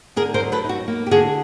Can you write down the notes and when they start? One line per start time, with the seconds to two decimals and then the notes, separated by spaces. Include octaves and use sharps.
0.16 D3 G#4 A#4
0.34 A#4 C5
0.40 F#3
0.52 A4 B4
0.64 D#4
0.69 F#4
0.88 A#3
1.07 G4
1.11 D3 F#4 G#4